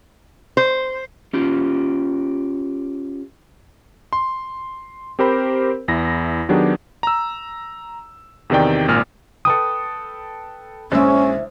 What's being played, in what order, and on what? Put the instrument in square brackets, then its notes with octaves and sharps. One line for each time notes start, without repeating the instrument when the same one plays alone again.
[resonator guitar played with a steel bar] C5
[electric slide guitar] C#4 F4 G4
[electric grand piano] C6
C4 G4 A#4 C5 B5
E2 E4 A#6
D#3 F#3 B3 D4 G4 G#4
A#5 E6
E2 C3 D#3 D5 G5
G#1 A#2 F6
[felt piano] A4 B4 G5 [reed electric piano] D#6
[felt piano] A#1 G#3 E6 [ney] C#4 [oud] E4 C5